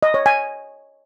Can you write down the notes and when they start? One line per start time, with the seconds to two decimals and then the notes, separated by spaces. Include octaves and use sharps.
0.03 D#5
0.14 C#5
0.26 G#5